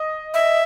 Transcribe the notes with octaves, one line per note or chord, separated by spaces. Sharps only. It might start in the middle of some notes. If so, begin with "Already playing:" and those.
Already playing: D#5
E5